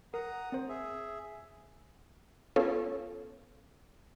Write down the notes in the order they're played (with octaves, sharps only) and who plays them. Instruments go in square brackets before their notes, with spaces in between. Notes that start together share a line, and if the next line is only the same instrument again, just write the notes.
[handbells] A#4 [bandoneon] F#5 A#5 D#6
[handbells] C4 C5
[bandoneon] G#4 E5
[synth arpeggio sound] B3 C#4 F4 A4 C#5